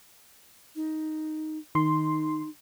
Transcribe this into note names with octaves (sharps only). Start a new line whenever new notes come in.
D#4
D#3 D#4 C6